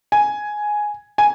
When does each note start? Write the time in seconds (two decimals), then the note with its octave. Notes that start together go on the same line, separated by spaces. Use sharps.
0.12 G#5
1.18 G#5